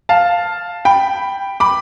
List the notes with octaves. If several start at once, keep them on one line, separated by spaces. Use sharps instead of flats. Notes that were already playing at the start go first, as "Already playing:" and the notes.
F5 A5
G5 B5
B5 D6